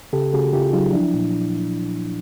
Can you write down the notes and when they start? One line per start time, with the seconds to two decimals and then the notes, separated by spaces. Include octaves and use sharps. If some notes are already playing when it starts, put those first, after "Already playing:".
0.13 C#3 G4 A4
0.33 C#3 F#4 G#4
0.53 C#3 F4 G4
0.73 F#3 D#4 F4
0.93 F3 D4 E4
1.14 A#2